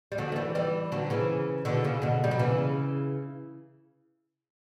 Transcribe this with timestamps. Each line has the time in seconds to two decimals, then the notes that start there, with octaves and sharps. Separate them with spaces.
0.12 G3
0.18 D3 F#3
0.32 A3
0.36 E3 G3
0.55 E3 G3
0.92 D3 F#3
1.10 C#3 E3
1.65 B2 D3
1.84 C#3
2.02 B2 D3
2.24 G3
2.31 F#3
2.39 C#3 E3